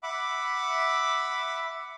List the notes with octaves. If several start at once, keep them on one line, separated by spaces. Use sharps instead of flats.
E5 F#5 B5 D6